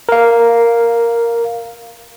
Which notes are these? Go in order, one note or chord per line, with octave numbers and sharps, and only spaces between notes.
A#4 F5